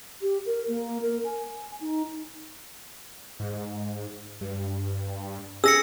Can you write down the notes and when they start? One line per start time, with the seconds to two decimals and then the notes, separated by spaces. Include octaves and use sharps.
0.22 G4
0.46 A#4
0.68 A#3
1.02 A#4
1.25 G#5
1.81 D#4
3.40 G#2
4.41 G2
5.64 G#4 E6 A#6 C#7